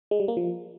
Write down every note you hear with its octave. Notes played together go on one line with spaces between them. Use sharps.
G#3
G3
A#3
F3